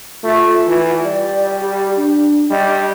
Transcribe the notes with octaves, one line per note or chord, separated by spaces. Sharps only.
A3 F4
E3
G3 D5
G4
D4
G3 D#5